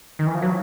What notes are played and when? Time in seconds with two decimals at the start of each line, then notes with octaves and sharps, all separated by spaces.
0.19 D#3
0.27 E3
0.34 F3
0.42 F#3